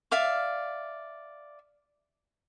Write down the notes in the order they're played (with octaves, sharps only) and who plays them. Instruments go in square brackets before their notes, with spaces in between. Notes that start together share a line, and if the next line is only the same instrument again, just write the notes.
[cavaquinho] D5 E5 F5 D6